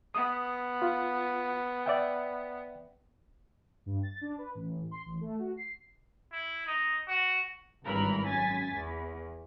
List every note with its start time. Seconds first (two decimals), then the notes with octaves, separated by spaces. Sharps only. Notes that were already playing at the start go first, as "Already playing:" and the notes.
0.15 B3 D#6
0.82 F4
1.86 D5 E5 G5
3.86 G2
4.03 A6
4.21 D4
4.38 B4
4.55 A1
4.91 C6
5.06 A1
5.21 A3
5.39 F#4
5.57 C7
6.32 E4
6.67 D#4
7.08 F#4
7.85 G#1 G2 E3 A#4 B5
8.26 F#2 G#5 A6 B6
8.74 E2